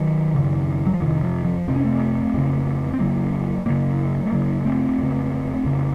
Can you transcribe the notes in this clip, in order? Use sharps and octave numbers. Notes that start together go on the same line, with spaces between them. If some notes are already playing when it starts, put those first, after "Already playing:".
Already playing: D#3 F#3
F#2 C#3
F#3
F3
F2 C3 D#3
F3
F3
F2 C3 C4
C#4
A3 C4
F2 C#3
C4
F2 C#3 F#3 A#3
F#2 C#3 F#3 A#3
A3
F#2 C#3 F#3 A#3
A3 C4
F2 C#3
F2 C#3